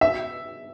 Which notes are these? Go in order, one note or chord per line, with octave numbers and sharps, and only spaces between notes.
E5